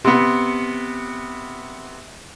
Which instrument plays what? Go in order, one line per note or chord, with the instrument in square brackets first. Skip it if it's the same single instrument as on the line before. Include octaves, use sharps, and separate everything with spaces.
[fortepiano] C3 B3